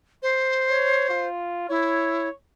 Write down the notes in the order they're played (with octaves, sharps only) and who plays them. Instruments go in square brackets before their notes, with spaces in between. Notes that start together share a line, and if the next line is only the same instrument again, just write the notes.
[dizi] C5
[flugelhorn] C#5
F4
[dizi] E4 [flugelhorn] C#5